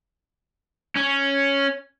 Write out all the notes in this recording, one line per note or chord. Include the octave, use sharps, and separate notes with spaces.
C#4